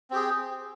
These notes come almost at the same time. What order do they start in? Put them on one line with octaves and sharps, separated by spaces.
C4 G4 G#4